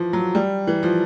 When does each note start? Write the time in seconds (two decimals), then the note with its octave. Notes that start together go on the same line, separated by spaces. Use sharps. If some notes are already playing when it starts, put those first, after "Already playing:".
Already playing: E3 F3
0.13 F#3
0.35 G3
0.67 E3
0.83 F3